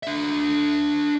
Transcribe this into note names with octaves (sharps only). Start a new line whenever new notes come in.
D4 E5